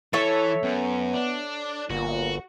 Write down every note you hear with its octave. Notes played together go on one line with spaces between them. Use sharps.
E3 A4 C#5 E5
F#2 B3
D4
G1 A#2 F#4